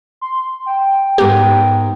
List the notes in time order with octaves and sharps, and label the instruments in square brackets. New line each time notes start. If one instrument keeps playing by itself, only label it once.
[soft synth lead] C6
G5
[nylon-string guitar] G#2 B3 A#4 [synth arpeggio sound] G4